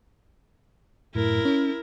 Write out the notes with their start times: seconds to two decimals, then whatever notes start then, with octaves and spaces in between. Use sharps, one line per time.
1.15 F#2 A2 E4 A#4
1.45 C#4